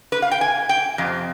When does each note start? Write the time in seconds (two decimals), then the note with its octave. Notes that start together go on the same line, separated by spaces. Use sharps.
0.12 B4
0.22 F5
0.31 G5
0.41 G#5
0.69 G5
0.98 F2 C3